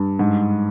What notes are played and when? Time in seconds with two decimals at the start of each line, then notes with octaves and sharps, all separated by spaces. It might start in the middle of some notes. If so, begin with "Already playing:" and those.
Already playing: G2
0.19 G#2